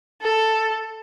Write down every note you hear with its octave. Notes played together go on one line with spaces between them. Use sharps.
A4